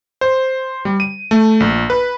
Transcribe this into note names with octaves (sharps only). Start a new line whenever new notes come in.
C5
G3
D#7
A3
A#1
B4